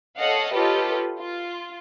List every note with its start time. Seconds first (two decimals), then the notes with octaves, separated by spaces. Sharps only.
0.17 A4 C#5 D#5 F5 F#5
0.53 F4 G4 A4 B4 C#5 D#5
1.18 F4